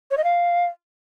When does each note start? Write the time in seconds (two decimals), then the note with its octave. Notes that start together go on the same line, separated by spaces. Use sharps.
0.11 C#5
0.17 D#5
0.24 F5